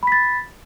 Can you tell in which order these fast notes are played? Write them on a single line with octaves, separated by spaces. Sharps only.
B5 B6 A6